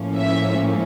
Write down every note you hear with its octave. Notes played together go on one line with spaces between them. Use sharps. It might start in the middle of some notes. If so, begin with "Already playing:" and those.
Already playing: A2 F3 A#3 C#4
E5